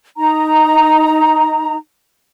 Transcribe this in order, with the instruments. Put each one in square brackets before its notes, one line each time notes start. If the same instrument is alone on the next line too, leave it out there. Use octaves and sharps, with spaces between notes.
[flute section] D#4 A#5